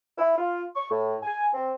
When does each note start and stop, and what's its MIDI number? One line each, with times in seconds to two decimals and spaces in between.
0.18 0.34 64
0.38 0.64 65
0.76 0.87 85
0.91 1.16 45
1.23 1.49 80
1.54 1.71 60